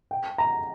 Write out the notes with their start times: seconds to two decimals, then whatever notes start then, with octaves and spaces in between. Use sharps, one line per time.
0.11 G5
0.38 A#5